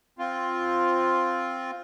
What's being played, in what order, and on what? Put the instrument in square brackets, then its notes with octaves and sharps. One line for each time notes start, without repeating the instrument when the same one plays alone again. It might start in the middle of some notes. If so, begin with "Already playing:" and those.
[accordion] C4 F4